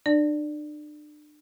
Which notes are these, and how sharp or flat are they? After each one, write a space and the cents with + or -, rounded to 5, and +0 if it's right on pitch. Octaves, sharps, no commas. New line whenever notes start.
D4 +40 D5 +0